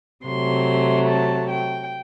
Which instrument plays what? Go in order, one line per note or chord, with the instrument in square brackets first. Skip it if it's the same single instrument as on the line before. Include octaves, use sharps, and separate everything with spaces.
[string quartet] C3 F#3 A3 C6
A5
G5